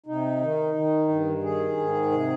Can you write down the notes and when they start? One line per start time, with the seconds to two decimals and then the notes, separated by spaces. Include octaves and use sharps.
0.06 C3 D#4
0.41 D#3
0.75 D#3
1.08 G2
1.43 D#3 G#4
1.77 G#2
2.11 C3